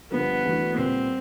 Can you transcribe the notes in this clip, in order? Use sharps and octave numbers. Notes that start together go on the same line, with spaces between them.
G2 D3 F3 B3
E3 A3 D4 F#4
A#2 G3 B3 C4